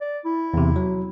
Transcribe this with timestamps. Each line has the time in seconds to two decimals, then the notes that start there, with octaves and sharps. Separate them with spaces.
0.01 D5
0.25 E4
0.54 E2 C3
0.76 F#3